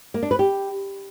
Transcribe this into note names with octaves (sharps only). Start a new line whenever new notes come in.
A#3
D4
B4
G4